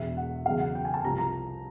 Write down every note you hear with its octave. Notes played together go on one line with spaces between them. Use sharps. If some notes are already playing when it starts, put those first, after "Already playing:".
Already playing: E1 E2 B2 E5
F#5
E2 C#3 F#3 F5
F#5
G5
G#5
A5
C2 C3 F3 A#5
A#5